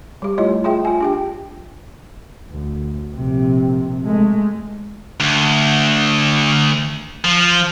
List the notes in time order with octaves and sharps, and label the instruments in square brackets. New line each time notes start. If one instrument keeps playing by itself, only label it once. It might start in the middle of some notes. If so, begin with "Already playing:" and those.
[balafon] G3 G4
A3 E4 F4 C#5 D#5
F4 G#4 E5 G5
F4 G#5
D4 G4 G5
[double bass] D2
A#1 C3
G#3 A3
[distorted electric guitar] D2
F3